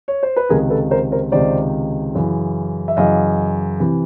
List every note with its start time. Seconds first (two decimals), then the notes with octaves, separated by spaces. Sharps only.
0.08 C#5
0.23 C5
0.37 B4
0.49 C#2 C3 D#3 G#4 A#4
0.70 A4 B4
0.91 A#4 C5
1.12 A#4 C5
1.32 C#2 C3 D#3 C5 D5
2.15 F#2 C#3 E3
2.88 E5
2.97 F#2 C#3 E3 D#5 F5
3.80 C3 E3